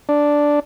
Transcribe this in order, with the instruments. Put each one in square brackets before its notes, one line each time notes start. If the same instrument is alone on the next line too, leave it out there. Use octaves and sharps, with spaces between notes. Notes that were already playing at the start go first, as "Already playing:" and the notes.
[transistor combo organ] D4